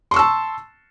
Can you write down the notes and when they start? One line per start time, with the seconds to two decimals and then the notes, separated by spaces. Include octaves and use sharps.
0.11 C6
0.14 C#6
0.16 E6
0.19 A5